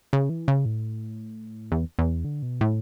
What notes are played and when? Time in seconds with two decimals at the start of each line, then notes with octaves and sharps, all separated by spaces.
0.13 C#3
0.29 E3
0.48 C#3
0.65 A2
1.72 E2
1.99 E2
2.25 D3
2.42 B2
2.61 A2